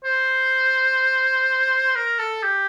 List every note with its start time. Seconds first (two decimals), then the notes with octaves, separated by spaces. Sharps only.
0.04 C5
1.95 A#4
2.19 A4
2.43 G4